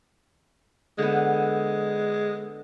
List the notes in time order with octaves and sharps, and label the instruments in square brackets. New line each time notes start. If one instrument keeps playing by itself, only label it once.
[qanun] D3 B3 [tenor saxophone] G#3